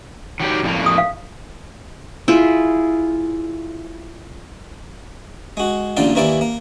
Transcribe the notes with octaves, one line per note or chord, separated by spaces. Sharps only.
D#3 F#3 G4
F2 A2 A#3
D#6
F5
E4 F4 G#4
G#3 F#4
A1 A#2 D3 F4 D5 C6
D#2 E3 A#3 E4 D5
A#3